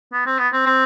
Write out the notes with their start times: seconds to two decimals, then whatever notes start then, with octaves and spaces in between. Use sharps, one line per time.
0.13 B3
0.26 C4
0.39 B3
0.53 C4
0.66 C4